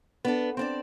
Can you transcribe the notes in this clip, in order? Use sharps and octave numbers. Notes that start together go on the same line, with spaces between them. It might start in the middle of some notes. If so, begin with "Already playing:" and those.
B3 D4 A4
C4 D4 D5